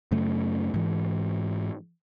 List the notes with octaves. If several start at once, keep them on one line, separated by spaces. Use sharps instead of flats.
F#2 C#3 A3
G#2 E3